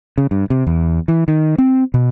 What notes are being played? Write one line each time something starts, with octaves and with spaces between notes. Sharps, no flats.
C#3
G2
C3
E2
E3
D#3
C4
B2